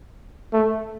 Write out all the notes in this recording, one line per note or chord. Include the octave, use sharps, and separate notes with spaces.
A3